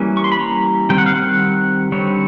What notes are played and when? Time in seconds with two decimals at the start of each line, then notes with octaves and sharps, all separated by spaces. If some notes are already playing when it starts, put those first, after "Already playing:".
Already playing: E3 G3 A#3 C#4
0.17 C#6
0.24 C6
0.32 B5
0.39 A#5
0.89 D#3 G3 C4 G5
0.98 F#5
1.06 F5
1.15 F#5
1.92 D3 G3 C4 C#5